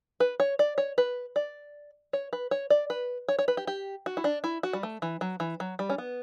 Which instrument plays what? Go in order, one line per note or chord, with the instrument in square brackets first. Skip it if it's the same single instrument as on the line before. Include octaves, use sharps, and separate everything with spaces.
[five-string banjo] B4
C#5
D5
C#5
B4
D5
C#5
B4
C#5
D5
B4
C#5
C#5
B4
G4
G4
F#4
E4
D4
E4
F#4
G3
A3
E3
F#3
E3
F#3
G3
C#4
B3